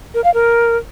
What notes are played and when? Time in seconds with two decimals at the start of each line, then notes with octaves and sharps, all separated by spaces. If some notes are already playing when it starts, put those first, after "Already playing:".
0.14 A#4
0.24 F5
0.34 A#4